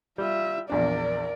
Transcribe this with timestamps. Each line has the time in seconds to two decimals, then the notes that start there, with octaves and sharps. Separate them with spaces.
0.18 G3 F4 E5
0.70 A#1 E2 D4 A#4 D5